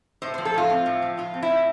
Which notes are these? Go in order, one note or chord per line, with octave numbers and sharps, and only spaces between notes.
A2 C5
F3 C5
A4
A2 F4
C4
A2
F3
A2 F4
C4
E4
A2